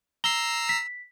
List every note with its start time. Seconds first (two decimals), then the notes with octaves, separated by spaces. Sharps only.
0.24 A#5 E6 C7 G7
0.69 B6